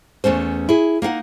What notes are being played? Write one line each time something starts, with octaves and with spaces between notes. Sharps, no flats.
E2 A3 C#4 C5
E4 G#4
A#3 D#4 F5 F#5